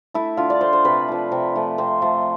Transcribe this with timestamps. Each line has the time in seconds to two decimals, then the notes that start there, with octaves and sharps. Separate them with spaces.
0.14 A3 E4
0.37 D3 F4
0.50 D5
0.61 A3 C5
0.73 C5
0.85 C3 B4
1.08 F3 A3
1.32 C3
1.55 F3 A3
1.78 C3 C5
2.02 F3 A3